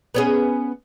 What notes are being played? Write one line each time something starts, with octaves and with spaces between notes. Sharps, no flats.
B3 C#4 G#4